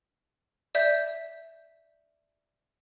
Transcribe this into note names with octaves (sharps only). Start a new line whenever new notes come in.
D5 E5 G6